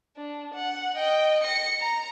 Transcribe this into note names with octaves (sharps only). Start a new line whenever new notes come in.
D4
F#5
D#5 G5
A#6 C#7
A#5